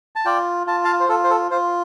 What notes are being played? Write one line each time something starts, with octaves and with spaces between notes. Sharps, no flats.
A5
F4 D5 G5
F4 A5
F5 A5
C5
F4 A4
C5
A4
F4 C5